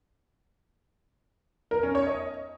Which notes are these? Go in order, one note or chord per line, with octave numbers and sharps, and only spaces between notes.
A#4
C#4
C#5
D#5